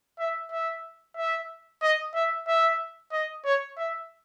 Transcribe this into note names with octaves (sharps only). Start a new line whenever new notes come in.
E5
E5
E5
D#5
E5
E5
D#5
C#5
E5